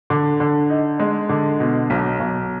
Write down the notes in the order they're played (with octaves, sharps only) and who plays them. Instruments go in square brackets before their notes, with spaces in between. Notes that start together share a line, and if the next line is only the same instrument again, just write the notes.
[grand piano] D3
D3
D#4
G#3
D3
B2
B1
B1